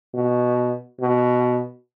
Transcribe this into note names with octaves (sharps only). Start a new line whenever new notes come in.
B2
B2